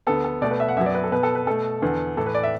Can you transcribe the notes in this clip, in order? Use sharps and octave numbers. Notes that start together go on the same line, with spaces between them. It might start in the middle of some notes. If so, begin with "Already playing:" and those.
D2 D3 B3 A4
A4
B2 A3 D5
B4
E5
F#5
F#2 F#3 B3 E5
D5
B4
A4
B2 B3 B4
A4
B4
B2 A3 A4
E2 D3 B3
A2 E3 A3 A4
B4
D5
E5